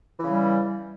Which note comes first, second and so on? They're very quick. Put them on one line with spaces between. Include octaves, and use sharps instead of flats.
E3 C#3 G3